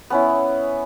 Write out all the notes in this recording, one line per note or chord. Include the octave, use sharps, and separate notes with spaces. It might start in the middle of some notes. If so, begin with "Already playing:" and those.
B3 C#4 E4